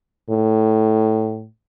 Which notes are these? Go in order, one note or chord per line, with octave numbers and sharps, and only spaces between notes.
A2